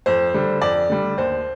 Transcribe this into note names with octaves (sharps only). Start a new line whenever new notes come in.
F2 C5
D3 G3
F2 D5
D3 G3
D#2 C5